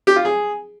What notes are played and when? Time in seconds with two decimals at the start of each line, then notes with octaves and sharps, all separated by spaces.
0.07 G4
0.16 F4
0.25 G#4